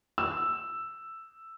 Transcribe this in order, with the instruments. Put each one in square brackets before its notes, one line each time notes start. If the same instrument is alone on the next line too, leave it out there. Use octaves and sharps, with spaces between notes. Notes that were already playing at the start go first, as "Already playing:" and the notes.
[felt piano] E6